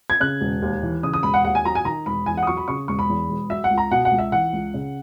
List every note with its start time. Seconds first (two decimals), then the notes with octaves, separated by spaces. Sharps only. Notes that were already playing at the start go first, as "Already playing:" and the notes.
0.10 G#6
0.20 C#3 F#6
0.41 E1
0.62 D#2
0.83 E3
1.03 C#3 D#6
1.14 D#6
1.23 E1 B5
1.34 F#5
1.44 D#2 F#5
1.55 G#5
1.65 F#3 A#5
1.75 G#5
1.85 D#3 A#5
2.06 E1 B5
2.26 E2 G#5
2.37 F#5
2.43 D#6
2.47 F#3 C#6
2.57 B5
2.68 C#3 C#6
2.88 E1 C#6
2.99 B5
3.10 E2
3.29 E1
3.50 F#3 E5
3.64 F#5
3.71 C#2
3.78 A#5
3.91 B2 F#5
4.05 F#5
4.11 C#2
4.19 E5
4.32 E3 F#5
4.53 C#2
4.74 C#3